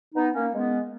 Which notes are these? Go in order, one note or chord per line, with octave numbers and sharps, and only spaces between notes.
B3 D#4
A#3 C#4
G#3 B3